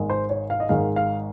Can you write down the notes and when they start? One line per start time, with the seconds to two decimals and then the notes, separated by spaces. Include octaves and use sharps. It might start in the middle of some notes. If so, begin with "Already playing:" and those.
Already playing: G#1 G#2 D#3 G#3
0.10 C5
0.30 C#5
0.50 F5
0.60 D#5
0.69 G#1 G#2 D#3 G#3 F5
0.96 F5